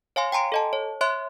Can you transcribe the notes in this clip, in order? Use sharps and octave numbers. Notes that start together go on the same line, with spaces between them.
C#5 F5 G#5 C6
G5 G#5 A#5 C6 D7
A4 D#5 A5
C#5
C#5 E5 C6 F#6